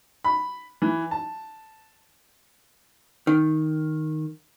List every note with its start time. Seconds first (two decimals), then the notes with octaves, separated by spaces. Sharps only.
0.24 B5
0.82 E3
1.11 A5
3.27 D#3